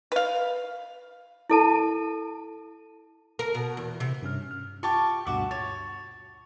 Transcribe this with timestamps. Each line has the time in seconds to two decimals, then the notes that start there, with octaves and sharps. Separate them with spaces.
0.12 B4 F5
1.50 E4 A4 A5
3.39 A#4
3.55 B2
3.77 E2
4.00 C3
4.22 G2 C#4 F6
4.51 F6
4.83 F4 G4 A5 C#6
5.27 D2 G2 B2 F#4 E5 D6
5.51 C#5 A6